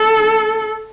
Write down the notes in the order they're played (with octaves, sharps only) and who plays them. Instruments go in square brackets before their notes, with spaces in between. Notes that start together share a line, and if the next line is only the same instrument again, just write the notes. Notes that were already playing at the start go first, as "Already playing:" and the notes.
Already playing: [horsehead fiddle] A4